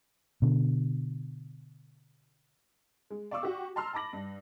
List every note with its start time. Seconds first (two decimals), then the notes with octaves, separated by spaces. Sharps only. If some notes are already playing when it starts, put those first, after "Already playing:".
0.42 B2 D3
3.10 G#3
3.31 D5 F5 C#6 D6 E6
3.43 F#4 G4
3.76 A5 A#5 C6 E6 F6
3.93 A5 B5 D6 A#6 F#7
4.13 G2